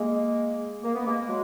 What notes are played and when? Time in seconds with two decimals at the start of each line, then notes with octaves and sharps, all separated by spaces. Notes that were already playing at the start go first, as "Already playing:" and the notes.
Already playing: G#3 A#3
0.83 A#3
0.94 B3
1.06 G#3 A#3
1.27 F#3 G#3